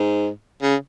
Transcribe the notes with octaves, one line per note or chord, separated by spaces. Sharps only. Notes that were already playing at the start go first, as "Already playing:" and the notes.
Already playing: G#2
C#3